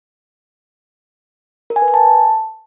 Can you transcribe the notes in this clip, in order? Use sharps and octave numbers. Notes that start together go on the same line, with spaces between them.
A#4
G#5
B4
G#5
A5